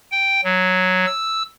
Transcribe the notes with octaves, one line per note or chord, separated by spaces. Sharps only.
G5
F#3
E6